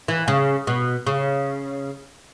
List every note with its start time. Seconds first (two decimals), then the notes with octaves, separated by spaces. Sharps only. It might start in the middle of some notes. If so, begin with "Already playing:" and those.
0.08 E3
0.28 C#3
0.67 B2
1.07 C#3